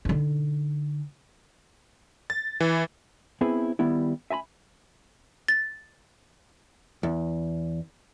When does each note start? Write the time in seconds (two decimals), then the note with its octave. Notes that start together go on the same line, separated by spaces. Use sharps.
0.05 D3 D#4
2.30 A6
2.60 E3
3.41 B3 C4 E4 G#4 B4
3.79 D#3 G3 B3 E4
4.30 E5 G#5 A#5 B5
5.48 A6
7.03 E2